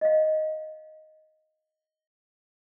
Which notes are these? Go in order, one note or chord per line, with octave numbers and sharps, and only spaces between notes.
D#5 F5